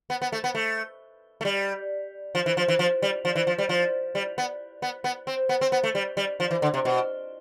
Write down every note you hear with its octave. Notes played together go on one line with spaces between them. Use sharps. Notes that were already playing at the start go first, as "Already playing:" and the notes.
B3
B3
A3
B3
A3
A3
G3
F3
E3
F3
E3
F3
G3
F3
E3
F3
G3
F3
G3
B3
B3
B3
C4
B3
C4
B3
A3
G3
G3
F3
E3
D3
C3
B2